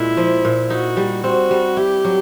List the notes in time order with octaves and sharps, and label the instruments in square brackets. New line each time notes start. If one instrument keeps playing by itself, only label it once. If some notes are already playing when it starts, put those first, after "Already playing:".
Already playing: [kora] A#2 G#3 [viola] E4
[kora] F3
A#2
[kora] D#4 [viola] F#4
[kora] G3
[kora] C4 [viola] F#4
[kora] G3
[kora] E4 [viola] G4
[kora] F#3